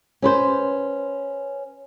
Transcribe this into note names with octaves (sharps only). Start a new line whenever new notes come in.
C#4 B4 C5